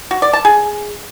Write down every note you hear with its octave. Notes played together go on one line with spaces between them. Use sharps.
F#4
D5
A5
G#4